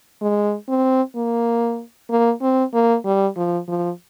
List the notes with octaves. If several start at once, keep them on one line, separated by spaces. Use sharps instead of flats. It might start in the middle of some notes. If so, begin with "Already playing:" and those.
G#3
C4
A#3
A#3
C4
A#3
G3
F3
F3